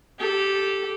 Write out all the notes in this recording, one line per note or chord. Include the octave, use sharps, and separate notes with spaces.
G4 A4